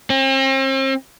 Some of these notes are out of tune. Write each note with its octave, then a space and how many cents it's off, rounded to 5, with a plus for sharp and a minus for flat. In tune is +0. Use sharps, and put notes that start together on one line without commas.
C4 +40